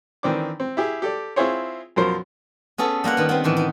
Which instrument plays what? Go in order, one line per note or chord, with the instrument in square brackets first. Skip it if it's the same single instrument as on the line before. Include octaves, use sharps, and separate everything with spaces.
[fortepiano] D#3 E3 C4 D4 D6
C4
E4 G4 G#4
G4 A4 D5
C4 E4 F4 G#4 C5 C#5
F#2 B2 F3 A#4 C5
[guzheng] B3 C#4 G#4 A4
G3 A#3 F4 F#5
D#3 B3
B3 C4
A2 D#3 E3
D#4